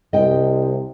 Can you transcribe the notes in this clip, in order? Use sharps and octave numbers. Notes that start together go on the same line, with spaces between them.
C2 D#5 G5